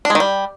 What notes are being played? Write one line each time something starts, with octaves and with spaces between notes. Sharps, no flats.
D4
G#3
D#3
G3